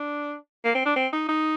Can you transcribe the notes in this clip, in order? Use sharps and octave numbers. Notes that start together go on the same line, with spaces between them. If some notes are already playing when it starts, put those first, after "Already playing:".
Already playing: D4
A#3
C4
D4
C4
D#4
D#4